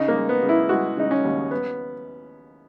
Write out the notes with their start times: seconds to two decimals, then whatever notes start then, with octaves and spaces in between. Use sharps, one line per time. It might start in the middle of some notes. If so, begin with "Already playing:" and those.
Already playing: C#3 D#4
0.08 A#3
0.16 G#3
0.29 B3
0.42 C#3
0.49 E4
0.69 G#3 F#4
0.97 C#3 D#4
1.11 C#4
1.24 D#2
1.51 B3